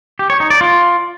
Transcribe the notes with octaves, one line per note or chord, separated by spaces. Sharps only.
G4
C#5
D#4
D5
F4